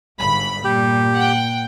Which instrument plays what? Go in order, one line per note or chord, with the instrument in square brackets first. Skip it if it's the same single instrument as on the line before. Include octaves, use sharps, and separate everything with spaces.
[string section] G1 G#2 B5
[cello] A#2 [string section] G3 [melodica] G4
[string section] F#5 G5